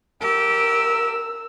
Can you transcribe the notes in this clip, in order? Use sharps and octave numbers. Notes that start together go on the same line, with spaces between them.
G4 A#4 E6